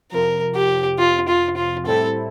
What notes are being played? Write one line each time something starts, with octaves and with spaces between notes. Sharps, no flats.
F2 C3 F3 A#4
G4
F4
F4
F4
A2 G3 C4 E4 A4